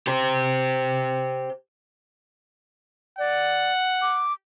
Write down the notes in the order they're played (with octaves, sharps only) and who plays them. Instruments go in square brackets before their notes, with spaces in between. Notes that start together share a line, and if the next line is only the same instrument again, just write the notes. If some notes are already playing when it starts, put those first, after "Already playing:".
[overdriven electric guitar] G4 C5
[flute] D5 [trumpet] F#5
[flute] D6